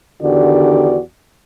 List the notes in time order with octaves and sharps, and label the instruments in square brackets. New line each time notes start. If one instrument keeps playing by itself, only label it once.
[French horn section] E2 D3 D#3 F#4 G4 D5